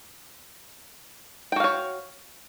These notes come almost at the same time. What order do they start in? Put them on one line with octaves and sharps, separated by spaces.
G5 F#4 F5 C#5